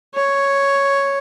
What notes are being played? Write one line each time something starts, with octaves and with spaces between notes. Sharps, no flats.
C#5